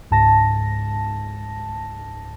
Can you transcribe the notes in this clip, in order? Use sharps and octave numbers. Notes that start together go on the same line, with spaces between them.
C#2 G#2 A5 A#6